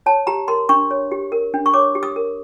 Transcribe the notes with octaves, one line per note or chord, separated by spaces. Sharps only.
C#5 A5
G4 A#5
A#4 C6
D4 C#6
C#5
G4
A#4
D4
C#6
C#5 D6
G4
D#6
A#4